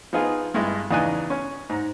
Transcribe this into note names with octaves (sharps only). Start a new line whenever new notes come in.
F3 B3 D#4 F4 G#4
G2 G#3 A3 E4
E2 C#3 D4 D#4 G#5 F#6
C#4
G#2 A#5